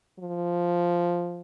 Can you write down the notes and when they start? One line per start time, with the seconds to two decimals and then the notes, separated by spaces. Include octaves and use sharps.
0.19 F3